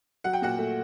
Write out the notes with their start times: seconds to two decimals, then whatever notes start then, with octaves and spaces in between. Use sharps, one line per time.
0.24 F#3 F#5
0.33 G5
0.42 A#2 F#4 F#5
0.58 A3